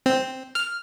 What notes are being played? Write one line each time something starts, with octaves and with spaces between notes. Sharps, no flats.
C4
F6